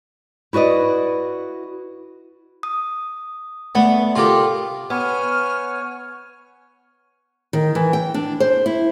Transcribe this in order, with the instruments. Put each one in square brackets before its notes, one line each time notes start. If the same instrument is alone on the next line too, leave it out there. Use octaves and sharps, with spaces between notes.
[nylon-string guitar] E4 F#4 B4 D5 D#5
[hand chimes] D#6
[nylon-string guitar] A3 D5 F#5 [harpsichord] B3
[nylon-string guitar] C3 A#4 [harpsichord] F4 G4 [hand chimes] A4 G5 C6
[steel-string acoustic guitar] B3 [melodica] C#5 G#5 [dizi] F6
[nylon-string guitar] D#3
E3
G5
D4
C5
E4